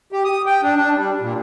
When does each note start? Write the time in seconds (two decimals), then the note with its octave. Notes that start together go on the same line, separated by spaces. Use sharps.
0.12 G4
0.24 D#6
0.46 G5
0.63 D4
0.76 D4
0.95 G3
1.20 A#2